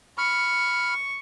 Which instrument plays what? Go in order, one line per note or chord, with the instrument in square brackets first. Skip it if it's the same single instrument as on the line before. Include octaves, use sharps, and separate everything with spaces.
[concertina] B5 F6 [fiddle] C#6